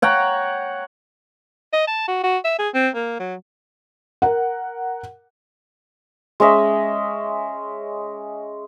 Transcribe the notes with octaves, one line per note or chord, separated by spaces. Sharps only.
C#5 F#5 G5 A#5
D#5
A5
F#4
F#4
E5
G#4
C4
A#3
F#3
A#4 F#5
G#3 C#4 D#5 E5